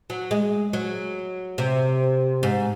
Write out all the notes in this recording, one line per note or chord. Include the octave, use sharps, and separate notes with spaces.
F#3
G#3
F#3
C3
G#2